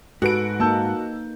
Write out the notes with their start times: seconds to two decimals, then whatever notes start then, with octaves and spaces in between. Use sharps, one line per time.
0.22 G#2 F#4 A4 B4 D7
0.60 A#3 D#4 A5 E6 G6